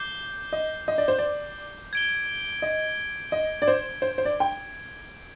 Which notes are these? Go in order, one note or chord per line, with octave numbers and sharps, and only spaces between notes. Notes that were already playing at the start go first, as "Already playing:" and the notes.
Already playing: D6 G6 C7 G7
D#5
D#5
D5
C5
D5
G#6 D7 G7
D#5
D#5
D5
C5
C5
C5
D5
G5